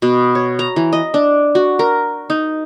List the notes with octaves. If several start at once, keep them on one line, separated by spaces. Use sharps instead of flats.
B2
C#5
A#5
E3
D#5
D4
F#4
A#4
D#4